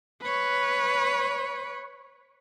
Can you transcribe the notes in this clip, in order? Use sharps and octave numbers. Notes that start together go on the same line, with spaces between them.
B4 C#5